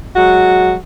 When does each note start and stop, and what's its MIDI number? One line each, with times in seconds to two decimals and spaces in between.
0.16 0.75 54
0.16 0.75 56
0.16 0.75 66